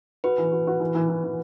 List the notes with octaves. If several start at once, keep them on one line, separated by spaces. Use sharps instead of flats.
F#4 B4
E3
F#4
F#4
E3
E3
E3
E3